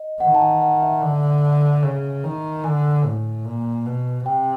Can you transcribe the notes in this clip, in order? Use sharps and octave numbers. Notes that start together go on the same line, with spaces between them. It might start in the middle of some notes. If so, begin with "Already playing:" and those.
Already playing: D#5
D#3 F#5
A5
G#5
F#5
E5
D3
C#3
D#3
D3 G#5
A2
A#2
B2
C3 G5